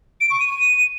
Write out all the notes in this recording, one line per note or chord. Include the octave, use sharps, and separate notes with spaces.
D7
C#6
D#7